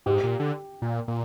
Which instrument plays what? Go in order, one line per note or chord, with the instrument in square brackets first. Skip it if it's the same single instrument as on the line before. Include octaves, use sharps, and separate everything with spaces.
[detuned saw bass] G#2 [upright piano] G4
[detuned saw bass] A#2
D3
A#2
A#2